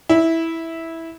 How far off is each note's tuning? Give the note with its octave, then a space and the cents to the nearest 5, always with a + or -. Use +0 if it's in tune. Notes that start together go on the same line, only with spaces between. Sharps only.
E4 -10